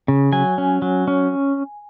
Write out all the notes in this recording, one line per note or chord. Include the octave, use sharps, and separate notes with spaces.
C#3
F#3 G#5
C#4
F#3
C#4